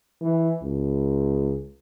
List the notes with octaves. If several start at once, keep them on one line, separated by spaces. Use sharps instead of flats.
E3
C#2